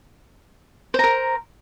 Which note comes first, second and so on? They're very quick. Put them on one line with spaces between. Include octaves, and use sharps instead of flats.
C5 A#5 A#4